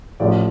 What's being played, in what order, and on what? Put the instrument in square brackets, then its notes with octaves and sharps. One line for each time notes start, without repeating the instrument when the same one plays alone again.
[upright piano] A1 A2 F3 D5